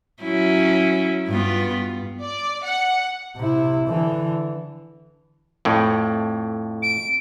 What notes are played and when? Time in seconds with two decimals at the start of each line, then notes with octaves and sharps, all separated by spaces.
0.23 F#3 C#4 E4
1.28 G2 B3 F4
2.22 D5
2.64 F#5
3.37 C3 E4
3.88 D3 E3
5.65 F2 A2
6.82 D7